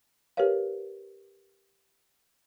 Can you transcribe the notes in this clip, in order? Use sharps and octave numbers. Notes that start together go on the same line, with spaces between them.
G4 A#4 B4 C#5 F5